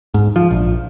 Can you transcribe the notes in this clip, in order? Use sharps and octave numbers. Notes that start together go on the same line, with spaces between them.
G#2
F3
A#1